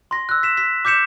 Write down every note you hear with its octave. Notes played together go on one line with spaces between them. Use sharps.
C6 A#6
E6 F#6
B6 E7
B6
D6 G6 B6 C#7 E7